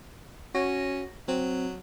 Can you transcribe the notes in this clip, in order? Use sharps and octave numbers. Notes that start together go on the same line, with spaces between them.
C#4 F#4 C#5 A#6
F#3 C4